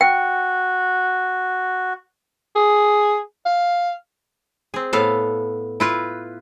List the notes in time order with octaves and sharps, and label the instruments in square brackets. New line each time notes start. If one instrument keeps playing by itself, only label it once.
[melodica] F#4 [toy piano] G5
[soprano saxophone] G#4
F5
[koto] C4 G#4
A2 B3 A4 F5
E4 F4 B4